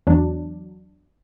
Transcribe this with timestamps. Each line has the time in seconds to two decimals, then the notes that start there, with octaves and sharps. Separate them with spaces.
0.07 E2 F#3 D4